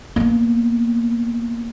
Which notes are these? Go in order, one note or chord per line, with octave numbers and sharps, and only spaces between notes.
A#3 B3